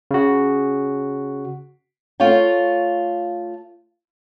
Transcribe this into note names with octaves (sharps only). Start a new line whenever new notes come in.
C#3 F#4
A3 F4 C#5 F5 G5